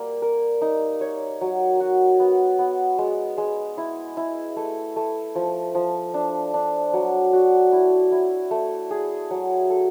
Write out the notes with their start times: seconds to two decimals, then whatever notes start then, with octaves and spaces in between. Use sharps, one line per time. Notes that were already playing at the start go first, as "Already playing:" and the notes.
Already playing: G3 A#3
0.22 A#4
0.62 D#4
1.01 C#5
1.41 F#3
1.80 F#4
2.20 B3
2.59 B3
2.99 G#3
3.38 G#3
3.78 E4
4.17 E4
4.57 A3
4.96 A3
5.35 F3
5.75 F3
6.14 D4
6.54 D4
6.93 F#3
7.33 F#4
7.72 E4
8.12 E4
8.51 A3
8.91 G#4
9.31 F#3
9.70 A4